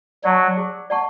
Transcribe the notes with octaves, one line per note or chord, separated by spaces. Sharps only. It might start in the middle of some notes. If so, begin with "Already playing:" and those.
F#3 D5 F#5 A5 C#6
G#4
D5 F#5 A5 C#6